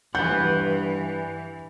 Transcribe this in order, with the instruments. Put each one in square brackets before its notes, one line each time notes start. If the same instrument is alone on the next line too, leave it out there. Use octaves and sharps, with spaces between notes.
[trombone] G2 [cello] E3 [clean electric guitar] B4 F#5 [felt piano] G6